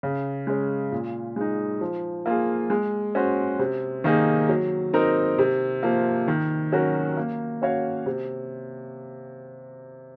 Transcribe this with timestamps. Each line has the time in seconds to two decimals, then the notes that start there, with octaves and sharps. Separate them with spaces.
0.03 C#3
0.47 G#3 C#4
0.92 A#2
1.36 G#3 D#4
1.81 F3
2.26 A#3 F4 G#4
2.70 G#3
3.15 C#4 F#4 C5
3.59 C3
4.04 D#3 A#3 D#4 G#4
4.49 F#3
4.93 C4 D#4 A#4
5.39 C3
5.83 F3 A#3
6.28 D#3
6.72 F#3 C#4 F#4 A#4
7.17 A#3
7.62 C#4 F#4 C#5 F5
8.06 C3